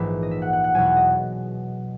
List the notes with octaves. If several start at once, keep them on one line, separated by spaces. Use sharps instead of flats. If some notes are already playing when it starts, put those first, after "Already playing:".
Already playing: A#1 G#2 E3 E5
D#5
E5
F#5
F#5
F#5
E2 B2 F#3 G#5
F#5
D#5